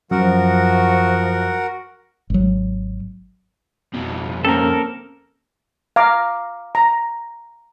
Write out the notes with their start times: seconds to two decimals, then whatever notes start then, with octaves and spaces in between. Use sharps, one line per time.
0.11 F#2 F3 F#4 A#4 F#5
2.30 G#1 F#3
3.94 F2 B2
4.45 A#3 C4 C#4 A4 A#4 A#5
5.96 F5 A#5 D6
6.75 A#5